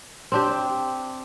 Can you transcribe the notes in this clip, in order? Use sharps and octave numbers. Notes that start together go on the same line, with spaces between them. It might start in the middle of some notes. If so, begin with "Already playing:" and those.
C4 D4 G4